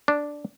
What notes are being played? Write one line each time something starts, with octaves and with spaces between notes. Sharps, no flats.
D4